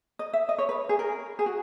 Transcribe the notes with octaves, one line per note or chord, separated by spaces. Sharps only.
D#5
E5
D#5
C#5
B4
G#4
A#4
G#4
F#4